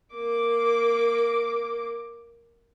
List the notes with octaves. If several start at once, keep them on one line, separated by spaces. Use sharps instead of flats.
A#3 D6